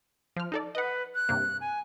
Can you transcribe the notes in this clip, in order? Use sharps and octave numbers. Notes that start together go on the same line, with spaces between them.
F3 F6
D#4 A4 D5
B4 D#5 F#5
F#6
G2 C3 A#3
G#5